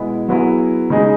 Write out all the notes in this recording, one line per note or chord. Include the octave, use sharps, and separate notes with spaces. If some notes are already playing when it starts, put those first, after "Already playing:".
Already playing: B2 G#3 B3 E4
F#3 B3 E4 G#4
C#3 G#3 D#4 G#4